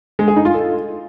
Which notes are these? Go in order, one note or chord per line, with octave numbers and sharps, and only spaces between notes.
G#3
G#4
D#4
F4
A4